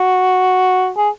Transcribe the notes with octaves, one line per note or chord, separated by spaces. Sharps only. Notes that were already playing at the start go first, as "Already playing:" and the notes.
Already playing: F#4
G#4